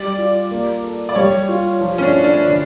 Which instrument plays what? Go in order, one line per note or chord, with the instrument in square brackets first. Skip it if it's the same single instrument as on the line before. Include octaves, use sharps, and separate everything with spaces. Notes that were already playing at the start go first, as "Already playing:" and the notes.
Already playing: [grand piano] G3 [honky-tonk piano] D5
[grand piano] F4
A#3
A4
[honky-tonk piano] D5
[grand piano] G3 [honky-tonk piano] C#5
[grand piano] F4
F3
[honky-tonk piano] C#4
D4
[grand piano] E4
[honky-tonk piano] D4
[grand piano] D3 [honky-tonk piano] D4